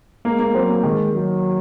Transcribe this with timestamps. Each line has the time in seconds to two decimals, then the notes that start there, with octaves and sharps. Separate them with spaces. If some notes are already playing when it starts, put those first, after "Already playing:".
0.25 G#3 A#3
0.39 A#3
0.54 F#3 C4
0.69 A#3
0.84 D#3 G#3
1.14 F#3